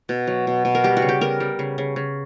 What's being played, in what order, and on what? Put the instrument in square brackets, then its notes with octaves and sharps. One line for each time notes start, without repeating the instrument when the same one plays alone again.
[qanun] B2
F#3
B2
B2
A#4
G3 G4
F#4
C#3
G4
B3 A#4
G3
C#3
C#3
C#3